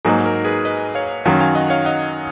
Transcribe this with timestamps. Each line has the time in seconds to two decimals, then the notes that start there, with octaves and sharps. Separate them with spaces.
0.05 G#2 F#3 A#3 D#4
0.26 A#4
0.45 G#4 B4
0.65 B4 D#5
0.95 C#5 F5
1.25 F#2 D#3 F#3 C#5 F5
1.41 F5 G#5
1.55 D#5 F#5
1.70 C#5 F5
1.85 D#5 F#5